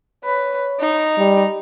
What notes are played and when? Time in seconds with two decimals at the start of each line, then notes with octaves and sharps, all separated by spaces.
0.25 B4 C#5
0.80 D#4
1.18 G3